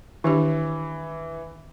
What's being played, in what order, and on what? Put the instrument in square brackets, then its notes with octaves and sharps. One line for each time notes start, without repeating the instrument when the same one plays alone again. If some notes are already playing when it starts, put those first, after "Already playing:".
[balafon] D#3 D4 G4 [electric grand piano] E3